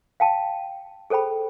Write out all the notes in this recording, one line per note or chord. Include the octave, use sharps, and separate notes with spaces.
F5 G5 A5
G#4 A4 C5 G5 B5